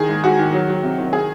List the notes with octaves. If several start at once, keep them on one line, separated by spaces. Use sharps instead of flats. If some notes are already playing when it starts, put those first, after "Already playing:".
Already playing: D#3 G#4
G#2
G#2 F#4
D#3
F#3
F#3
C3
D#3
G#4